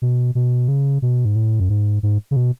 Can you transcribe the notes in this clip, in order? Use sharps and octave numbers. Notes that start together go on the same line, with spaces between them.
B2
B2
C#3
B2
G#2
A2
F#2
G#2
G#2
C#3
B2